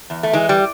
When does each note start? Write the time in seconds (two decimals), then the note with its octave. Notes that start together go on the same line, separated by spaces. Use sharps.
0.10 E2
0.23 A3
0.33 E3 G#3
0.49 G3